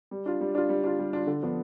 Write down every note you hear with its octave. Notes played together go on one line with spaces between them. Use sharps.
G3
D4 F4
G3
D4 F4
G3
D4 F4
G3
D4 F4
D3
F3 B3 D4